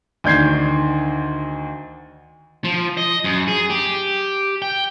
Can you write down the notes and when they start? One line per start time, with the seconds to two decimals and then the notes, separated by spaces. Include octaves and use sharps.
0.24 D2 D#3 D4 G6 G#6 C7
2.64 F3
2.97 D#5
3.24 F#2
3.48 G#4
3.70 G4
4.62 G5